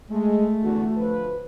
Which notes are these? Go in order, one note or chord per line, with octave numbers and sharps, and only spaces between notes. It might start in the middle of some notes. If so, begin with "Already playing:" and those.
G#3 A3
E2 D3 F#4
D2 F3 B4